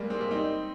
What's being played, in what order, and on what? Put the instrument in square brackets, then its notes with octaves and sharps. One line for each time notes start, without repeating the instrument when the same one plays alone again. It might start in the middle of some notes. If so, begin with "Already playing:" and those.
Already playing: [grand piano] G3 G#3 A#3
G#3 C4
G3 A#3
C4 D#4